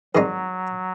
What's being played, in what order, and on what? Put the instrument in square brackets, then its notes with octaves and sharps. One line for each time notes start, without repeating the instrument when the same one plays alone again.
[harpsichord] G#2 D#3 G3 C4 D#4 [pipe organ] F#3